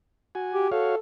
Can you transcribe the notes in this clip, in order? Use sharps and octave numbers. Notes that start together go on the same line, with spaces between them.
F#4 G#5
G4
F#4 A4 C#5 F5